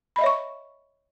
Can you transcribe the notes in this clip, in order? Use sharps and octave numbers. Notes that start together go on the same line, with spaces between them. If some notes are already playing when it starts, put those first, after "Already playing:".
C#5 D#5 E5 B5 C#6